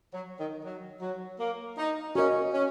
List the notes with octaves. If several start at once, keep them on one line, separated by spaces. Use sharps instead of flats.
F#3
D#3
F#3
F#3
A#3
D#4
C#4 F#4 A#4 D#5
C#4